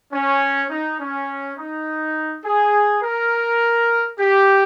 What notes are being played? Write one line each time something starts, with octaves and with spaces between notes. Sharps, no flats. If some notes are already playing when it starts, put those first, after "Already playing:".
C#4
D#4
C#4
D#4
G#4
A#4
G4